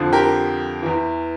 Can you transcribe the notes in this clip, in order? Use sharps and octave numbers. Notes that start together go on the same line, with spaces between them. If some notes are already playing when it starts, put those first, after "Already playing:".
Already playing: F2 D3 F3
G4 A#4
E2 E3